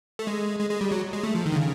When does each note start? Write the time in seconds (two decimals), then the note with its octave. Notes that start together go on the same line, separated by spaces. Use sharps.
0.19 A3
0.27 G#3
0.59 G#3
0.70 G#3
0.81 G3
0.91 F#3
1.13 G#3
1.23 A3
1.35 F3
1.46 D#3
1.52 D3
1.56 C#3